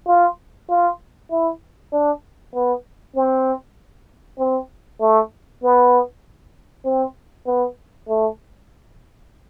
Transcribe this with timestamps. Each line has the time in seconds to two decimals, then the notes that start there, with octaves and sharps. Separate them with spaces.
0.08 F4
0.70 F4
1.31 E4
1.93 D4
2.54 B3
3.16 C4
4.39 C4
5.01 A3
5.62 B3
6.85 C4
7.47 B3
8.08 A3